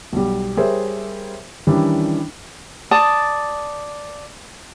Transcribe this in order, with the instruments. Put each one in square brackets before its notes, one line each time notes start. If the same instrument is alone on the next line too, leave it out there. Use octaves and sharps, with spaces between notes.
[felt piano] B1 G3
G3 G#4 A#4 C5 C#5 E5
D#3 E3 G3 C#4 D4 E4
[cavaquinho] D5 A5 D#6